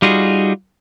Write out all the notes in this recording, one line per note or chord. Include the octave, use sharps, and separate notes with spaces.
G3 D#4 F4 F#4 G#4